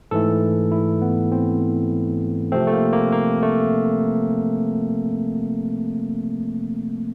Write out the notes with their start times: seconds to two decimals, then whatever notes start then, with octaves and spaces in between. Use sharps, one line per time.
0.11 G#2 E3 A3 A4
0.72 E4
1.02 B3
1.32 C4
2.52 C3 F3 A3 C4
2.67 A3
2.73 A#3
2.93 A#3
3.12 A#3
3.42 A3